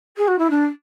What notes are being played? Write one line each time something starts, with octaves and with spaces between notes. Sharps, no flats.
G#4
F#4
E4
D4